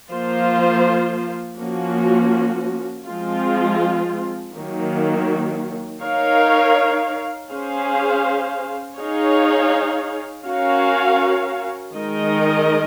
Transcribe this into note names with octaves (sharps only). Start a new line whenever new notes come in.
F3 A#3 F4 C5
F3 A#3 C#4 F#4
F3 G#3 C4 F4
D#3 F#3 A#3
D#4 A#4 C#5 F5
C#4 G#4 C5 F5
D#4 G#4 C#5 F5
C#4 F#4 A#4 C#5 F5
D#3 G#3 D#4 A#4 D#5